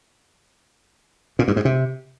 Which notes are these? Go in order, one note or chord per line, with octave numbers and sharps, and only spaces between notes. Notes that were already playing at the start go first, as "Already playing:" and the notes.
A#2
G2
G#2
C3